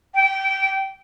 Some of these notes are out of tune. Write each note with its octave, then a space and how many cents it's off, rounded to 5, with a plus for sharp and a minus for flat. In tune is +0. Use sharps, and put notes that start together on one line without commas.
G5 -20